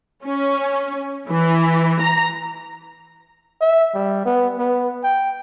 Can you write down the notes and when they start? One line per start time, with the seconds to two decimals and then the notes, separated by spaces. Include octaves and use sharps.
0.24 C#4
1.28 E3
2.01 A#5
3.61 E5
3.95 G3
4.26 B3
4.58 B3
5.04 G5